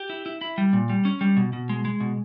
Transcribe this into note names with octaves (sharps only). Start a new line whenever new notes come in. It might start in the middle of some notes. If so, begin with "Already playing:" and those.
Already playing: G4
E4
E4
E4
G3
A#2
G3
C#4
G3
B2
B2
G#3
G#3
B2